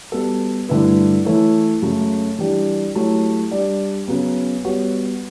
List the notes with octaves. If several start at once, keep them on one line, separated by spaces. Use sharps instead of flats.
G3 B3 F#4 A4
G2 D3 A3 E4 B4
E3 A3 E4 A4 C#5
F#2 C#3 F#3 A3
E3 G3 D4 G4
F#3 A3 E4 G4 C#5
G3 D4 G4 D5
C#3 F#3 B3
G3 B3 F#4 C#5